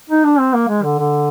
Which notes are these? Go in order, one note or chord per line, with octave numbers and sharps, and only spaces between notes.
D#4
D4
C4
A#3
G#3
D3
D3